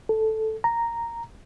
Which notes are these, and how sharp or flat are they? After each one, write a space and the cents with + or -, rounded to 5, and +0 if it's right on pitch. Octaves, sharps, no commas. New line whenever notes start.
A4 -5
A#5 -5